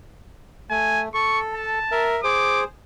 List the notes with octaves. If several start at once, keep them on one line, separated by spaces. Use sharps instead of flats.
A3 G#5
A4 C#6
A5
A#4 E5
G#4 C5 D6